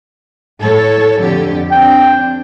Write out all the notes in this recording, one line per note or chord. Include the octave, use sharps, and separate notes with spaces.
A2 A4 C#5
F2 D3 G4
C4 D4 G5